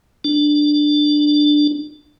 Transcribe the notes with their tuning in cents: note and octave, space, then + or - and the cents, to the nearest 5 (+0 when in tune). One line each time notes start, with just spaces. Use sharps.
D4 +10